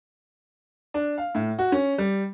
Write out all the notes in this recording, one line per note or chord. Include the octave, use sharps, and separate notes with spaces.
D4
F5
A2
F#4
C#4
G3